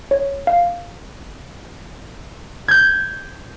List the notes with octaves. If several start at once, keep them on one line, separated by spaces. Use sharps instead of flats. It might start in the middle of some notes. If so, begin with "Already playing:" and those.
C#5
F5
G6 G#6